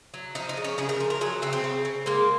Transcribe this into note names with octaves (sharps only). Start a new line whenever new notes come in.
F#3
F3 D#4
D#4
C#3
C#4
C#3 G#4
A#4
F3 A#4
A#4
F#3 G#4
C#3 C4
C4
C#3
C#3
G#3 A#3